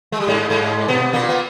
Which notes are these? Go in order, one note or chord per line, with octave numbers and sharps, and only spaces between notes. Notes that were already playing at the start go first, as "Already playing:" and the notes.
G#3
G3
G#2 G#3
G#2 G#3
B2 B3
A#2 A#3
B3